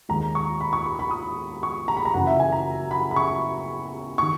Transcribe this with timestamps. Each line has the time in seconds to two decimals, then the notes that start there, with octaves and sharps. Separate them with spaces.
0.09 D#2 D#3 G#3 A#5
0.35 C#6
0.61 B5
0.73 C#6
0.86 C#6
0.99 B5
1.11 D#6
1.63 C#6
1.88 A#5
1.97 B5
2.05 A#5
2.14 F#1 F#2 E3 F#5
2.27 E5
2.40 G#5
2.52 A#5
2.91 B5
3.11 B5
3.16 C#6
4.18 D#3 C#6